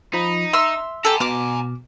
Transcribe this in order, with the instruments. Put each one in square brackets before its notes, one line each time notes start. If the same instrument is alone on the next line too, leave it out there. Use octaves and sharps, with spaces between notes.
[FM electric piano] F3 B5 [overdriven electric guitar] D#4
[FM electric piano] E5 [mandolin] C6 E6 F6
[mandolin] G4 A4 [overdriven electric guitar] G#5 A#5
[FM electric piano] B2 [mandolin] D6 F6